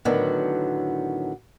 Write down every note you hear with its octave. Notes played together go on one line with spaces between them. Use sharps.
A2 D3 D#3 F#3 B3